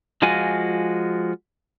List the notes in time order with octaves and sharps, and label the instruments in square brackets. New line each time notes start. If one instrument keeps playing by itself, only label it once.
[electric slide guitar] F3 G#3 F4 F#4 G#5